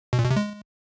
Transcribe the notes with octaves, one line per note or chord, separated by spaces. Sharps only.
B2
A#2
B2
C3
G#3